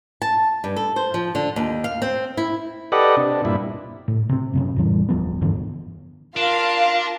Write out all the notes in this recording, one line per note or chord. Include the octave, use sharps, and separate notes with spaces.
A5
G2
A4
C5
F3
D3
D#2
F5
C4
E4
G4 A4 B4 D5 D#5 F#5
C3 D4
G2 A#2 E4
A2
C3 C4
F#2 C3 C#4
F2 A2 E3 G3
D#1 F3 B3
E1 G2 D3 E3
D4 F4 A#4 F5